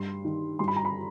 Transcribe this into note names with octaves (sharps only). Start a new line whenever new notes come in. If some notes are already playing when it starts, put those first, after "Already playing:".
Already playing: G2 C6
D#3
G2 C6
B5
A#5
B5